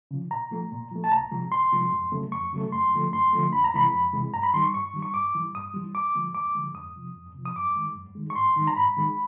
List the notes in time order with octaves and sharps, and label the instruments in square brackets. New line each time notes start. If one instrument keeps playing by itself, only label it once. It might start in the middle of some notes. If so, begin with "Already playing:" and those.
[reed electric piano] C#3 F3
A#2 A#5
F3 A3
A#2
F3 A3
A5
C2 A#5
C3 F3 G#3
C2 C6
C3 F3 G#3
F2
C#3 F#3 A3
F2 C#6
C#3 F#3 A3
F#2 C6
D3 F3 A3
F#2 C6
D3 F3 A3
F2 B5
A#5
C3 E3 G#3 B5
F2
C3 E3 G#3
G2 A#5
B5
D#3 G3 C6
C#6
G2 C#6
D#3 G3
C#6
G2 D6
E3 G3
G2 D#6
E3 G3
D#2 D6
D3 F3 G#3
D#2 D6
D3 F3 G#3
F2 D#6
C3 F3
F2
C3 F3
D#6
F#2 D6
D#3 G#3
F#2
D#3 G#3
C#6
G#2 C6
D#3 G#3
A#5
G#2 B5
D#3 G#3